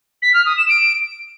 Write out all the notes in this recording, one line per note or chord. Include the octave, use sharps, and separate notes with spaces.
B6
F6
D#6
E7
D7